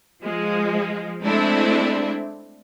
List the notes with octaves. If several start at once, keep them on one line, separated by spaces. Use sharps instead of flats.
F3 G#3
G#3 A3 C4 D4 E4